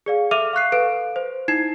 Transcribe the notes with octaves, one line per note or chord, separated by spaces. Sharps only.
G#4 D5 F5
A4 E5 D6 F6 D#7 F7
F5 C#6 F#6 C7
A4 B4 F5 D7
C5
D#4 E4 G#6 C7 E7